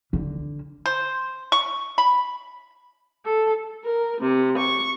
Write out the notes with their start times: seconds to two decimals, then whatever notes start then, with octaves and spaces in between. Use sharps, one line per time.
0.13 D3
0.86 C5
1.52 C#6
1.98 B5
3.25 A4
3.85 A#4
4.20 C3
4.57 C#6